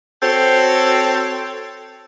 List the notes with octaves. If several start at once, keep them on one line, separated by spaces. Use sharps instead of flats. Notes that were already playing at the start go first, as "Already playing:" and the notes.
C4 F#4 A4 C5 C#5